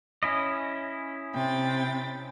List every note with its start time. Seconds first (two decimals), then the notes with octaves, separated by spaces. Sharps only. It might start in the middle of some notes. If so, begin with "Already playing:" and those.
0.23 C#4 E4 D#5
1.33 C3 G5 A6